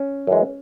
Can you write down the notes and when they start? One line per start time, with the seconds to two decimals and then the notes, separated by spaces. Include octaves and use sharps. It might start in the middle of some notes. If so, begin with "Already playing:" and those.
Already playing: C#4
0.27 F#2 E3 G#3